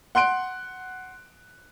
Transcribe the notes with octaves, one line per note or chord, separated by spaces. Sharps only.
F#5 C6 F#6 D7